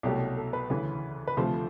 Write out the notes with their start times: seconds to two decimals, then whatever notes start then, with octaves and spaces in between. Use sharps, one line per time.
0.03 C2 B2 F#3 A3 G4
0.37 A4
0.53 B4
0.70 D2 C#3 E3
1.28 B4
1.37 D2 C3 F3 A3 C5